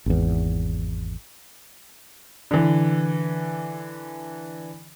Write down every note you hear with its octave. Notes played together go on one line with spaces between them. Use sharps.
G#1 E2
D3 E3